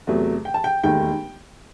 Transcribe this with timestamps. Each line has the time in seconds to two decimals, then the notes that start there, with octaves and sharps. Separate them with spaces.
0.07 E2 C3 F#3 A3
0.45 G5
0.54 A5
0.64 G5
0.83 E1 D#2 D#3 A3 G5